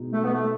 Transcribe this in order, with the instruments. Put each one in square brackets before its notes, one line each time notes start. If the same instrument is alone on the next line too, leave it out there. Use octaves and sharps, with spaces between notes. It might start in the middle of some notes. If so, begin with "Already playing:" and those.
Already playing: [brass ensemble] B2 G#3 D#4
[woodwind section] A3
B3
A3